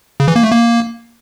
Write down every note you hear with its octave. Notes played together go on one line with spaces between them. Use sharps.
C#3
E3
A#3
A3
A#3